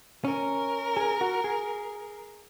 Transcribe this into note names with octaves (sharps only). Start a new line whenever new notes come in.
C#4 A#4
G#4
F#4
G#4